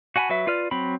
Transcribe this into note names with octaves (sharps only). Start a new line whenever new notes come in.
F#4 F#5 G#5 A5 B5
F#3 F#4 B4 E5
F4 B4 D5 F6
F#3 C4 B5